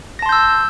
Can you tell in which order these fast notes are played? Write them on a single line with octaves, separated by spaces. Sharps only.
A#6 A5 C6 G6 E6